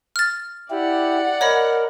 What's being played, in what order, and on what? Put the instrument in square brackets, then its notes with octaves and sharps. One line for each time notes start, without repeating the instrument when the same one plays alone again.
[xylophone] F6 A6
[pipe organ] E4 G4 [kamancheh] D5 F#5
[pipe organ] A#4 [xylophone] C#5 D#5 B5